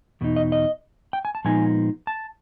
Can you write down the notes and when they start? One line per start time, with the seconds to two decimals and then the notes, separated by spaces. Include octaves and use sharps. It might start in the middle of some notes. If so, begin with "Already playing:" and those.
0.21 E2 B2 D#4
0.36 D#5
0.52 D#5
1.13 G5
1.25 G#5
1.35 A5
1.45 A#2 F3 G#3 B3 D#4 G#5
2.07 A5